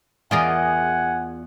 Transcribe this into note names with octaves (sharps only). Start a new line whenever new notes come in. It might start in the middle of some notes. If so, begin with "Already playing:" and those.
E2 F4 G#4 A#4 D5 D#5 F#5 G#5